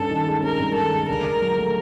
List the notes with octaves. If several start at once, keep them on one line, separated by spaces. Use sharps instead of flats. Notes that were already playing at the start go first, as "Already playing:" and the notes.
Already playing: G2 C#4 A4
D#3
G#3
C#4 A#4
G2
D#3 A4
G#3
D3 A#4
D3
F#3
A3